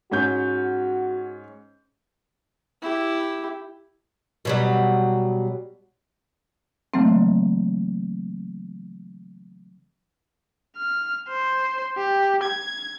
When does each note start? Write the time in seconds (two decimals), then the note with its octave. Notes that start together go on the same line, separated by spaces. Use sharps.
0.12 G#2 C#4 F#4 G6
2.82 E4 G4
4.45 B2 F#3 G3
6.94 C#3 E3 F#3 A3 A#3 C4
10.77 F6
11.28 C5
11.97 G4
12.43 G#6